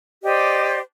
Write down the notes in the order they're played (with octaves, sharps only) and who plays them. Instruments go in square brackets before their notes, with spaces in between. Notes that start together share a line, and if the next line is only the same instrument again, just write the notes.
[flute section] G4 C5 D5 D#5